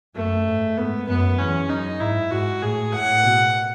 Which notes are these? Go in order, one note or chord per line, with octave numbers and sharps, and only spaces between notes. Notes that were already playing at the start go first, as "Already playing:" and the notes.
F#2 A3
G#2
G#2 B3
F#2 B3
E2 C#4
F#2 D#4
G#2 E4
G#2 F#4
A2 G#4
A2 F#5
B2